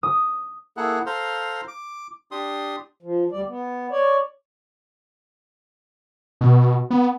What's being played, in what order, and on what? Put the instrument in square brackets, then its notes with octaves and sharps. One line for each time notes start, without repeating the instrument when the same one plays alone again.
[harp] D#6
[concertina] A#3 E4 G#4 A4 F#5
A4 C5 F5 A#5 C6
D6
D4 G4 C6 D#6
[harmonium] F3
D2 G3 D5
B3
C#5 D5
[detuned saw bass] B2
B3